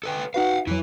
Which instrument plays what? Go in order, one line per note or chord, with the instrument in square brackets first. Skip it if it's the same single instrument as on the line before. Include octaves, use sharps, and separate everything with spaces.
[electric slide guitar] A4 B4 G5
[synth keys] D#4 F#4 B4 [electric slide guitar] F5 F#5
[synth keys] F2 F#3 [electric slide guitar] E4 B4